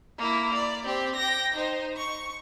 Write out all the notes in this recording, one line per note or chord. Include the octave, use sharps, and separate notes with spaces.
A#3 E4
D5
C4 G4
G5 A#6
D#4 C5
C#6